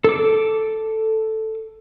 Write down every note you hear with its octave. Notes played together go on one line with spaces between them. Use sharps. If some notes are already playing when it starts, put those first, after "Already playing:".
A4 D6